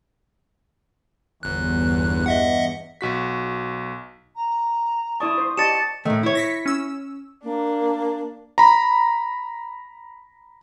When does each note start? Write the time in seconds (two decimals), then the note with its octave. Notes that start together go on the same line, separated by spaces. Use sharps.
1.43 G1 E2 G2 F#6
2.26 D#5 E5 F#5
3.01 B1 F#4 B6
4.36 A#5
5.20 E4 D5 A5 C#6 D#6
5.38 C5
5.58 G4 D5 D#5 A5 A6 C#7 E7
6.05 A2 D#3 A3
6.23 E4 C#5
6.35 A#6 B6 C#7
6.66 C#4 E6
7.43 A#3 D4
8.58 A#5 B5